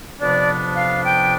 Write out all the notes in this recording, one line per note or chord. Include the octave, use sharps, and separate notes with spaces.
F2 C3 F3 B3 D4 D5
F5
G5